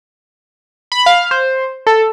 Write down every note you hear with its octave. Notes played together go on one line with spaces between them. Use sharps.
B5
F5
C5
A4